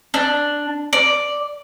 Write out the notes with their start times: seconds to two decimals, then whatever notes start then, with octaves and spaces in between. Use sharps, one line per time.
0.14 D4
0.93 D5